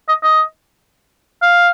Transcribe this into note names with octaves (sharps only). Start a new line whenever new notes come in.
D#5
D#5
F5